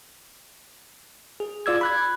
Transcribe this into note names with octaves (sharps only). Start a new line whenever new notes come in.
G#4
F4 D5 E6 G#6
B5 F#6 G#6